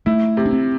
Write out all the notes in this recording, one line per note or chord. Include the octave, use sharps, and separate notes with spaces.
A3 E4
C3
D4
C4